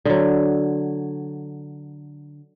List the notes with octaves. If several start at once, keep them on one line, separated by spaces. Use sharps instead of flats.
D3 F#3